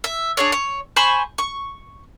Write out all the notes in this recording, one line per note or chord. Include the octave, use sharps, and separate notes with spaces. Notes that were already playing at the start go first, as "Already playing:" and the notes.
E5
D4 G#4 C#5
C#5
C5 G#5 B5 C#6
C#6